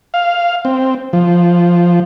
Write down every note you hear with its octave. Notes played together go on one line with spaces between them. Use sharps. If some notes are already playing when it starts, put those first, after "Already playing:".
F5
C4
F3